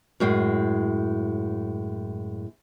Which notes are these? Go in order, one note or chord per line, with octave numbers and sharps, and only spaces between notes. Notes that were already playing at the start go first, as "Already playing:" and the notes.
F#2 A2 G#3